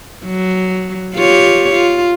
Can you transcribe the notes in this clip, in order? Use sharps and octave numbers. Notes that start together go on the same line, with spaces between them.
F#3
F4 G4 C#5
F4